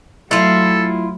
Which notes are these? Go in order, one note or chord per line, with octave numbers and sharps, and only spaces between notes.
F#3 A3 E4 F4 A4